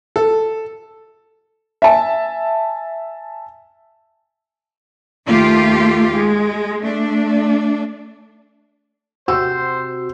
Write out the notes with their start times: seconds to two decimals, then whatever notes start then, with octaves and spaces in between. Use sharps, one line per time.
0.16 A4
1.82 E5 G#5 A5
5.27 D#2 A3 F4 G4
6.14 G#3
6.83 A3 D4
9.28 C3 F#4 C5 E6